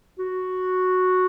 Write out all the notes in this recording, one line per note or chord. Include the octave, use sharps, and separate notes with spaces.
F#4